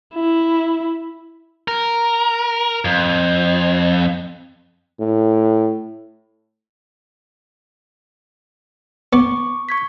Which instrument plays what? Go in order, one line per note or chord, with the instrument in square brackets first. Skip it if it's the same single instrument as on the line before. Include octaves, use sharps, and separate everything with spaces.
[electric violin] E4
[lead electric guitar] A#4
F2
[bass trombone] A2
[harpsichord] B3 [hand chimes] C#6 D6
[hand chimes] C#6 G#6 B6